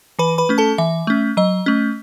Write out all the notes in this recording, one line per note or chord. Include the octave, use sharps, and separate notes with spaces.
E3 B4 B5
B4 B5
A3 C#4
A4 A5
E3 E5
A3 C#4
F#3 D#5
A3 C#4